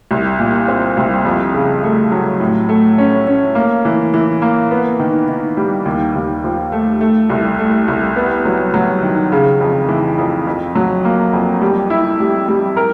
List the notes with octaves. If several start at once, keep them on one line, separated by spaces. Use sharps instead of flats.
C2
A#2
C4
C2
F2
C#3
A3
F#3
A2
A3
C#4
C#4
A#3
E3
E3
A#3
B3
D#3
D#3
G3
D#2
D#2
F3
A3
A3
C2
A3
C2
B3
F#3
F#3
D#3
C#3
F2
E3
F2
F2
F#3
A#3
F2
G3
E4
G3
G3
A#4